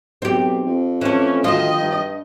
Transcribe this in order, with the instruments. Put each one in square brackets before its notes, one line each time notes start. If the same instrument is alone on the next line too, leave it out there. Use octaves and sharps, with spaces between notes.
[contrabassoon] B1 [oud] C4 G4
[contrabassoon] F2
[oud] E3 A3 [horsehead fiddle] C#4
[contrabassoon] D2 [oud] D#3 F4 [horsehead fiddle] D#5
[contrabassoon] G2